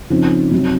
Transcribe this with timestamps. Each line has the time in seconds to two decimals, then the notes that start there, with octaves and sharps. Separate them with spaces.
0.10 C#3 F3 C4 D#4
0.51 C3 F#3 C4 D#4